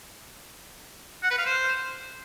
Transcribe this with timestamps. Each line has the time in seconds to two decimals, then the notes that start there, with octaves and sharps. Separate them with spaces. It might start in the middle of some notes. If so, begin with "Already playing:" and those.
1.23 F#5
1.30 B4
1.38 F5
1.45 C5